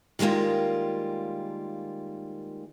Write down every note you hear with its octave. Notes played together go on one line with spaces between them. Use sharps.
D#3 G3 G#3 A#3 F4